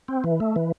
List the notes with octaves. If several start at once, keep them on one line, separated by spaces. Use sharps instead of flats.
C4
E3
A3
E3